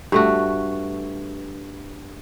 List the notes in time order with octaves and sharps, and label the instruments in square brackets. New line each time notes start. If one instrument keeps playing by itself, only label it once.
[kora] G2 A3 F#4